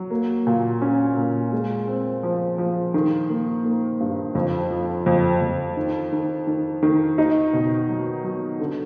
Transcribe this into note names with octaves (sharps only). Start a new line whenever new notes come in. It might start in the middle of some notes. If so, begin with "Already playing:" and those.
Already playing: F#3
A#3
A#2
C#4
A#2
G#3
C4
F3
F3
D#3
A#3
A#3
G2
F2
F3
F2
F2
D#3
D#3
D#3
D#3
D#4
B2
F#3
F#3
D3